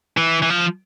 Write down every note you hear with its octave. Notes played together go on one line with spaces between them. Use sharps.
E3
E3
F3